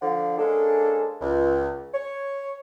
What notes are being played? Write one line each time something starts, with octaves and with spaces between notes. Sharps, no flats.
D3 F3 F5 F#5
G#3 A#3 C#4 D4 G#4 A4
C#2
C#5